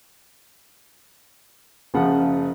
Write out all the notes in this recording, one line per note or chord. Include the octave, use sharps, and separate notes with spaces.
F#1 C#3 F3 F#5